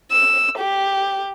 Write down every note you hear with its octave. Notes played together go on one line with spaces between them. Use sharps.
E6
G4